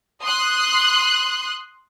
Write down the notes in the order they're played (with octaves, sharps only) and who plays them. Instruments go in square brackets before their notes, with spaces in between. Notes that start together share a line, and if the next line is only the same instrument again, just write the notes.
[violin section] C6 D#6 F#6